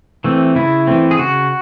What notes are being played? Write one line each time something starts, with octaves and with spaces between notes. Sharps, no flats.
E3 A3 C4
C#3 E4
E3 A3 C4
G#4
C#3 F#4